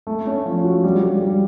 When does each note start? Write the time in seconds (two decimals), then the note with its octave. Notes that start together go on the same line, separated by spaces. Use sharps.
0.07 A3
0.27 C#4
0.46 F3
0.64 F#4
0.84 G3
1.02 G3
1.23 G3